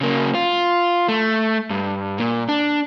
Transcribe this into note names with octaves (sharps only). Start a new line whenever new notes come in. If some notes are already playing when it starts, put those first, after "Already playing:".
C#3 A#3
F4
A3
G2
A#2
D4